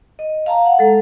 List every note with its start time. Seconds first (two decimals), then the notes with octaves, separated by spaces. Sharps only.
0.19 D#5
0.46 F5 A5 A#5
0.66 F#5
0.79 G#3 A4